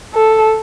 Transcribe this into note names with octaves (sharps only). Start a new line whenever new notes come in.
A4